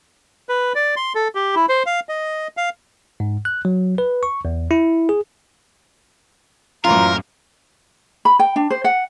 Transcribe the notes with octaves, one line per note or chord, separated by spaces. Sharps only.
B4
D5
C6
A4
G4
E4
C5
F5
D#5
F5
G#2
F#6
F#3
B4
C#6
E2
E4
G#4
F#2 A2 E3 A#3 F4 A#4 A#5
B5
G5
D4
C5
F#5